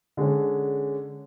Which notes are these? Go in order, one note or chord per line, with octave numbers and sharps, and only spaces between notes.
D3 G#3 C#4